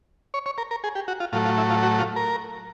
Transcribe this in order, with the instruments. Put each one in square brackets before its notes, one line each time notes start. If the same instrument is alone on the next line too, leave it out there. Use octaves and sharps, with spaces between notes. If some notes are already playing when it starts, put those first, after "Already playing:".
[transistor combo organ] C#5
C#5
A#4
A#4
G#4
G4
F#4
F4
A2 F#3 A3 F4
F4
E4
F4
F#4
F4
A#4